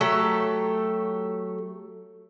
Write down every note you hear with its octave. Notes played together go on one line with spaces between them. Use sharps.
F#3 A3 G4 A4